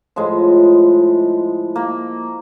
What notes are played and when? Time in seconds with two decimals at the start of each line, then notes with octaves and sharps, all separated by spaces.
0.16 A2 F3 G#3
1.76 A#3